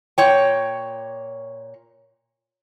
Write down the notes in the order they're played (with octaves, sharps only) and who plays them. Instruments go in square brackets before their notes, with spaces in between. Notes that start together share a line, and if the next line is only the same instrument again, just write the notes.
[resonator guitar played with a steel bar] A#2 C#5 G5